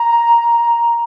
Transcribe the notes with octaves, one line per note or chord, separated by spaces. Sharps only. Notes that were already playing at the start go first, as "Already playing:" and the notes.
Already playing: A#5